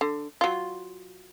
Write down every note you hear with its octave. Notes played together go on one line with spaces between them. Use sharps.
D3
F#3 F4